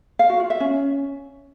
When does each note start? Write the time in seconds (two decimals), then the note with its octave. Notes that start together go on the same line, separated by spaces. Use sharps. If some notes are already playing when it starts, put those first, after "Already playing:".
0.19 F5
0.30 F#4
0.40 F4
0.50 E5
0.60 C#4